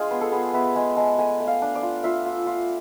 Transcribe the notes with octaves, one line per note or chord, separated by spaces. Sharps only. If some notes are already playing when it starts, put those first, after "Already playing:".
Already playing: G#3 D4 F4 G#4
B3
A4
B3 G#4
B3 E5
G#3 G#5
G#3 A5
A3 G#5
A3
F5
D4
D5
F4
F4 E5
F4
F4